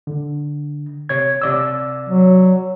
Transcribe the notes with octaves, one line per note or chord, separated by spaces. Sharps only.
D3
C3 C#5 G#6
C3 D5 E6
F#3